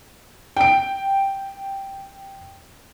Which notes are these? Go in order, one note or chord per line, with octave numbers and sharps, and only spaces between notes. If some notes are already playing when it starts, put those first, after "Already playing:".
G5 D7